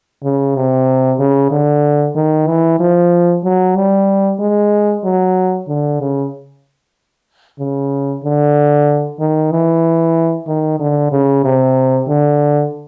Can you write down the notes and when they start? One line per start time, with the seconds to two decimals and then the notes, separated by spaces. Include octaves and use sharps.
0.23 C#3
0.55 C3
1.19 C#3
1.51 D3
2.15 D#3
2.47 E3
2.80 F3
3.44 F#3
3.76 G3
4.39 G#3
5.04 F#3
5.68 D3
6.00 C#3
7.59 C#3
8.24 D3
9.19 D#3
9.51 E3
10.47 D#3
10.79 D3
11.12 C#3
11.44 C3
12.08 D3